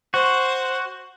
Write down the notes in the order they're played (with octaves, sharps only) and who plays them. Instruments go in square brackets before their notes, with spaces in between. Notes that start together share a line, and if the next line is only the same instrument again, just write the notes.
[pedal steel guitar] F#4 [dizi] C5